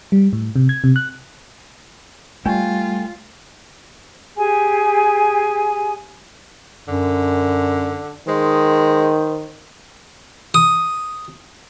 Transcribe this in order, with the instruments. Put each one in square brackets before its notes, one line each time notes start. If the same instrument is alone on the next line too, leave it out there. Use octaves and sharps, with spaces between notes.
[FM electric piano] G3
A2
C3
G#6
C3
F#6
[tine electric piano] G3 [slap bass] A3 [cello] F4 [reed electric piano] G5 G#5
[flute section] G4 G#4 G#5
[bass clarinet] F#2 [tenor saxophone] D3
[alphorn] D#3 [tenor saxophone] G#3 [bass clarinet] C5
[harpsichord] D#6